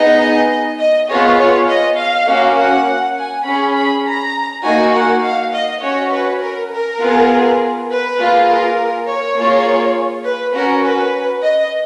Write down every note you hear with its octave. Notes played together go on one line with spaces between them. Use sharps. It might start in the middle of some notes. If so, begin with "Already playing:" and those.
Already playing: B3 D#4 G#4 D#5
D#5
B3 F4 G#4 C#5
C#5
D#5
F5
A#3 C#4 F#4
F#5
G#5
C#4 G#4 B5
B5
A#5
A#3 D#4 F#4 G#5
F#5
F5
D#5
C#4 F#4 C#5
B4
A#4
A#4
B3 F4 G#4
B4
A#3 F4 G#4
A#4
C#5
A#3 F4 G#4
B4
C#4 F#4 A#4
B4
D#5